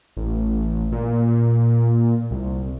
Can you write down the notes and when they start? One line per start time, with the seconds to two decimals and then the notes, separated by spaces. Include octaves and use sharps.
0.17 A1
0.92 A#2
2.31 C2